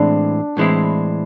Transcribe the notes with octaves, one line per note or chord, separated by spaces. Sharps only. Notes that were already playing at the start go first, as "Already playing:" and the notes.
Already playing: A2 E3 G#3 C4 D4 E4
A2 E3 G#3 C4 E4